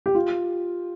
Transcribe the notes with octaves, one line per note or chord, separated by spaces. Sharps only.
G4
F4